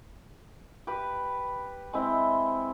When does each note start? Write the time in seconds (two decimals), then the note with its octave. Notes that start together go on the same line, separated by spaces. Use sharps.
0.87 G4 B4
1.93 G#3 C4 E4